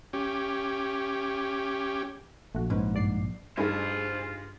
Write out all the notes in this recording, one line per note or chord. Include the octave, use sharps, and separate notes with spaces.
C#4 G4
A#1 A3 F#4
G#2 B3 C#4
G2 D5 C7
G2 D#4 F4 G#4 C5 G#5